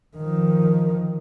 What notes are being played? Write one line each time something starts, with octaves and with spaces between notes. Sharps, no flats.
D#3 F3